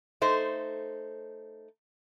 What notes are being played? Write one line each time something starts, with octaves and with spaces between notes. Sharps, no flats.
A3 D#4 C5